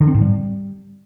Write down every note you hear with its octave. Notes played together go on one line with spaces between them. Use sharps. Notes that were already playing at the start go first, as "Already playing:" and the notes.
D3
C4
G#2
G3